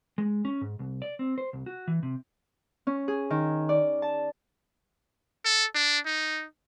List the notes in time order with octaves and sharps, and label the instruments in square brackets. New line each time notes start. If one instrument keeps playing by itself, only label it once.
[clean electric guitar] G#3
C#4
G#2
C2
D5
C4
C5
C2
F#4
E3
C3
[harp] C#4
G#4
D#3
D5
A5
[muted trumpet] A4
D4
D#4